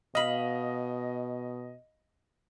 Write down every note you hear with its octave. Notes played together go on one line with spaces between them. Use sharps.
B2 D#5 F5 B5